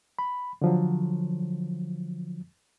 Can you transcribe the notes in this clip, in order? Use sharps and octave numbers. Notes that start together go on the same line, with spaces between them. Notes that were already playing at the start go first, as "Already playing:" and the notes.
B5
D3 F3 F#3